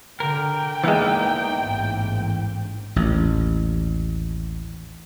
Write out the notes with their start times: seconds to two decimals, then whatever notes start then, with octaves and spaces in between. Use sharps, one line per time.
0.20 D3 A#4 G5
0.84 E2 E3 G#3 A#3 D#4 F5
1.60 A1 G#2
2.96 A1 D#2